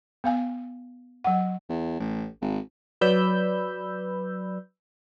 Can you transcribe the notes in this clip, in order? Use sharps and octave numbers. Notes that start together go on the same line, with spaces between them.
B3 F5 G#5
F#3 F#5
E2
A1
G#1
F#3 B4 D5 B5 E6 G6